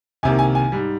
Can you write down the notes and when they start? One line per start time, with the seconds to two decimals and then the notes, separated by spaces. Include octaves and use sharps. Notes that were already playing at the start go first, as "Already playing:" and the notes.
0.23 C2 C3 D#3 A#3 G#5
0.39 G#5
0.55 G#5
0.72 G#2 G3